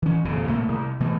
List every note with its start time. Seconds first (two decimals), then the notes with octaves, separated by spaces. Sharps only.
0.02 E3 C#4
0.25 D#1 F2 A#2 C#3
0.47 C2 A#2 A3 A#3
0.68 C2
1.00 B2 E3 A3